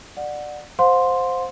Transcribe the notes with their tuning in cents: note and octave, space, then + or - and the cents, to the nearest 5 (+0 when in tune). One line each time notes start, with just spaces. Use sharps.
D5 +20 F#5 -10
C5 +0 F5 +45 C6 +0